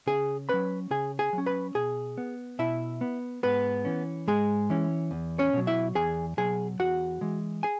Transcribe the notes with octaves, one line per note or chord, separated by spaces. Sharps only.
C#3 G#4 G#5
F#3 C#4 B4 B5
C#3 G#4 G#5
G#4 G#5
F#3
C#4
B4 B5
B2 G#4 G#5
B3
B2 E4 E5
B3
G#2 B3 B4
E3 C#4
G#2 G#3 G#4
E3 C#4
E2
C#4 C#5
B2 F#3
E4 E5
E2 G#4 G#5
B2 F#3 G#4 G#5
E2 F#4 F#5
E3 G#3
G#4 G#5